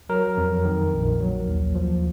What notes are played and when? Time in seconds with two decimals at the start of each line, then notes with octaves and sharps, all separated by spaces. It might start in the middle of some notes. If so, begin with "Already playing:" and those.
0.09 F#3 A#4
0.37 F2
0.65 D#3
0.93 A#1
1.20 F#3
1.47 D#2
1.75 F3